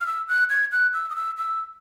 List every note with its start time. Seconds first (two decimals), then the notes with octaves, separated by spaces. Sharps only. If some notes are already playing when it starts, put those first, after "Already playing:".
0.01 F6
0.07 E6
0.29 F#6
0.50 G#6
0.72 F#6
0.94 E6
1.10 D#6
1.16 E6
1.37 E6